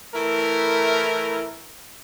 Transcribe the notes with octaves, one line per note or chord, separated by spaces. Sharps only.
E3 A3 E4 A#4